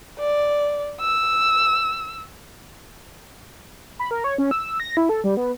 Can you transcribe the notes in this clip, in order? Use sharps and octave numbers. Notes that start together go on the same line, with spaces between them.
D5
E6
B5
A#4
C#5
C#4
E6
A#6
E4
A4
G3
B3